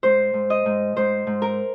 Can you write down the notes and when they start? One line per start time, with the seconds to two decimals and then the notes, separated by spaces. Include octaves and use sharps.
0.03 G#2 C5
0.34 G#2
0.50 D#5
0.66 G#2
0.96 G#2 C5
1.27 G#2
1.42 A#4